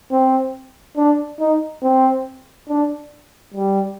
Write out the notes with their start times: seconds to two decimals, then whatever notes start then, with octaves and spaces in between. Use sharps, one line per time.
0.11 C4
0.97 D4
1.40 D#4
1.83 C4
2.69 D4
3.54 G3